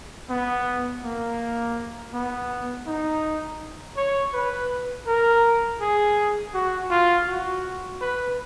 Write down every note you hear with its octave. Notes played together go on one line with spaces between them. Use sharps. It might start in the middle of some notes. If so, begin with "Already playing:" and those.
B3
A#3
B3
D#4
C#5
B4
A#4
G#4
F#4
F4
F#4
B4